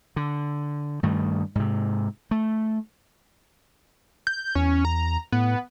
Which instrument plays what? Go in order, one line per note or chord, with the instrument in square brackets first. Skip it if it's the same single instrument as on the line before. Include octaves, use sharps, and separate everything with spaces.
[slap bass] D3
G2 D#3 A3
G#2 C3
A3
[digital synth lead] G6
[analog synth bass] E2 [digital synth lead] C#4
[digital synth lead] A#5
[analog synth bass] A2 [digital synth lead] B3